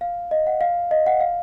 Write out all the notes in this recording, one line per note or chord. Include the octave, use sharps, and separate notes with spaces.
F5
D#5
F#5
F5
D#5
F#5
F5